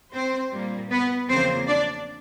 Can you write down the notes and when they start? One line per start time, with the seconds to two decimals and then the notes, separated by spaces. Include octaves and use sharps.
0.13 C4 C5
0.52 A#2 G3 A#3
0.90 B3 B4
1.28 E2 C#3 F3 A#3 C4 C5
1.67 D4 D5